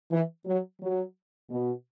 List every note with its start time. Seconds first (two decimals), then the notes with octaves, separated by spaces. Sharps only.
0.11 E3
0.46 F#3
0.81 F#3
1.50 B2